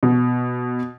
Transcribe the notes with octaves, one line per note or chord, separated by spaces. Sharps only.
B2